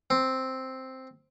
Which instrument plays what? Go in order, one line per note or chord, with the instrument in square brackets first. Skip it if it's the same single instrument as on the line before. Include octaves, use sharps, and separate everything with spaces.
[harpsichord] C4